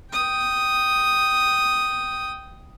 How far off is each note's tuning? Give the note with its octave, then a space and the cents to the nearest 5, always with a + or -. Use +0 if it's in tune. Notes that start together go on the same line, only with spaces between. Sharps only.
G5 -10 D#6 +0